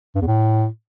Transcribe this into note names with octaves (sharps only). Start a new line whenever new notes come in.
G2
E2
A2